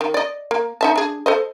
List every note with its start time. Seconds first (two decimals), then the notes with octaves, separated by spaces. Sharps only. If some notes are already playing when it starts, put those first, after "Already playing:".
0.01 D#3
0.14 D5 D#5
0.51 A#3
0.81 D#4 E5 A5
0.96 D4 G#4
1.26 A4 C5 D#5